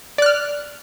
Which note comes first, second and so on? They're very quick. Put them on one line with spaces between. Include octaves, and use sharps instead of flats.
D5 F#6 F6